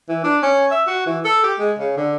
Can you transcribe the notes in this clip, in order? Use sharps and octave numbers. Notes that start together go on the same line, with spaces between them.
E3
D4
C#4
E5
F#4
E3
A4
G4
G#3
C#3
D3